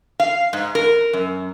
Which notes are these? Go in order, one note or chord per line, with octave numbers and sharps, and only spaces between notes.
F5
G#2
A#4
F#2